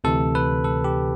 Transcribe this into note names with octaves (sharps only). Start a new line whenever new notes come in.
D2 C3 E3 A4
B4
A4
G4